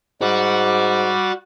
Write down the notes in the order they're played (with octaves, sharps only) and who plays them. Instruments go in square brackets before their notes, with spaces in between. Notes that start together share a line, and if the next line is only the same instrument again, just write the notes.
[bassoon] G#2 [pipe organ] G3 D6 [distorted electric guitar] F#4